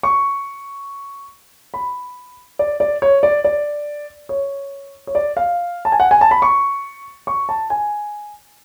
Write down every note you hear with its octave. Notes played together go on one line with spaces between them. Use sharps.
C#6
B5
D5
D5
C#5
D5
D5
C#5
C#5
D5
F5
A5
G#5
F#5
G#5
A5
B5
C#6
C#6
A5
G#5